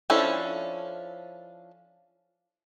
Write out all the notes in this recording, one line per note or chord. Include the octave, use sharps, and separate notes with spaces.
F3 C#4 D4 E4 A4